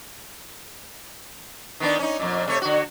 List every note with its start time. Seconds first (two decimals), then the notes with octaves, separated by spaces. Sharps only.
1.80 D#3 B3 D4
1.99 C#4 D#4
2.19 F2 A#2
2.48 C3 A3 C#5
2.62 D3 F#4